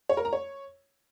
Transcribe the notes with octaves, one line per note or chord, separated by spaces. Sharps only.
C#5
A#4
A#5
C#5